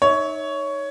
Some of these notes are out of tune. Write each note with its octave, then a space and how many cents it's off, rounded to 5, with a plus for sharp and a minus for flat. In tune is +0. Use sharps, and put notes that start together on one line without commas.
D#4 +0 C#5 +10 E5 -30